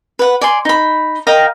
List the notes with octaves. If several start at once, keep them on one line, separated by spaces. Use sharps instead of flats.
B4 F#5
D5 G#5 C6
D#4 B5
A#4 D#5 F5 G5